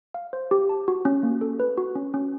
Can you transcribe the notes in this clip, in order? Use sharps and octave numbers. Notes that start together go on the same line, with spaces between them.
F5
C5
G4
A5
F#4
C#4
A#3
A4
B4
F#4
C#4
C#4